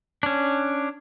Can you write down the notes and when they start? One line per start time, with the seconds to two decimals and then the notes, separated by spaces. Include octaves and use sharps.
0.23 C#4 D4